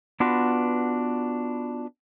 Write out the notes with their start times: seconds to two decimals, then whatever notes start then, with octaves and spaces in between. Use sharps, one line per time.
0.20 B3 D4 F4 F#4 B4